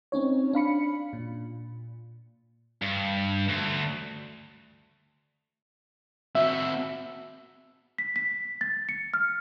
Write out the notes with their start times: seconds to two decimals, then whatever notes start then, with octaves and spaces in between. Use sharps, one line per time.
0.12 C4 C#4 D#4 C#5
0.53 D4 F5 B5 C#7
1.13 A#2
2.82 G2
3.49 D2
6.35 C4 F#4 E5
7.98 B6
8.16 B6
8.61 A6
8.89 C#7
9.14 F6